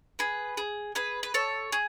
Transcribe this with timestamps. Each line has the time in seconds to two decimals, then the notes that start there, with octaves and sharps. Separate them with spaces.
0.19 G#4 B4
0.57 G#4
0.95 G#4 B4
1.23 B4
1.34 A4 C#5
1.72 G#4